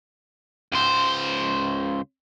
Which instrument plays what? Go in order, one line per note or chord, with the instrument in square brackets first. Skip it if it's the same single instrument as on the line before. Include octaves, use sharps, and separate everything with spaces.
[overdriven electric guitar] C#2 C5